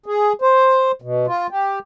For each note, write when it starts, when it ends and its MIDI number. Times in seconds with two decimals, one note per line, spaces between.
0.06 0.33 68
0.42 0.92 72
1.02 1.26 47
1.27 1.47 65
1.50 1.79 67